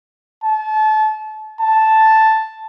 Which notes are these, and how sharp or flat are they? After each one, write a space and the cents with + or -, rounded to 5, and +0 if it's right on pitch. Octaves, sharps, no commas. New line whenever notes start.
A5 -30
A5 +0